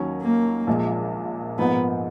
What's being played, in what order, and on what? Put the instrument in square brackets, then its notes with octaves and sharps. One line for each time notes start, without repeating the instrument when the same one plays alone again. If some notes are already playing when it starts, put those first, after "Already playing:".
Already playing: [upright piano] D#2 D#3 F#3 C#4
[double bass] A#3
[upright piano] A#1 A#2 F3 G#3
[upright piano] G#2 F3 A#3 [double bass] B3